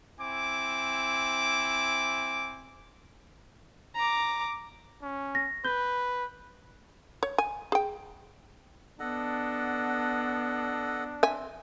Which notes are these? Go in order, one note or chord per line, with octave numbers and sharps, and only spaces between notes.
C4 E4 G#5 D6
A#5 D6
C#4
A#6
B4 G6 G7
C#5
G#5
G#4 G5
B3 D4 A4 D#5 F#5
C4 E5 G#5